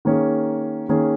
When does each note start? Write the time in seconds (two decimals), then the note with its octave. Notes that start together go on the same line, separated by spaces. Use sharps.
0.05 D#3 A#3 C#4 G#4
0.89 D#3 A#3 C#4 G#4